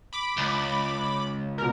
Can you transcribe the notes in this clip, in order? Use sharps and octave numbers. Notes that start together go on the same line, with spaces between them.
B5 D6
C#2
B2 A#4